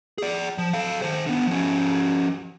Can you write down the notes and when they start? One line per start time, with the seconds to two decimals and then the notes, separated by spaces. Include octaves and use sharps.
0.18 G#4 D5
0.58 F3
0.73 A4 F5
1.02 D#3 C5
1.26 D3 B3
1.47 F3 C#4